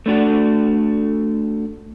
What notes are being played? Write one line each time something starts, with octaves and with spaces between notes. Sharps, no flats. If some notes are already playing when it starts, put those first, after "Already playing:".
A3 D4 F#4